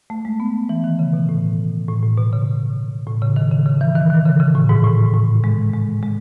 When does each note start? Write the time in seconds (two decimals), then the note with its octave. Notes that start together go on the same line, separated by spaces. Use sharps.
0.10 A3
0.25 G#3
0.40 B3
0.69 E3
0.84 D#3
0.99 C#3
1.13 B2
1.29 A2
1.88 A2
2.03 A2
2.18 B2
2.32 C#3
3.07 A2
3.22 C#3
3.36 D#3
3.51 C#3
3.66 C#3
3.81 E3
3.96 D#3
4.10 D#3
4.25 C#3
4.40 C#3
4.55 A2
4.69 G#2
4.84 A2
5.14 A2
5.44 G#3
5.73 G#3
6.03 G#3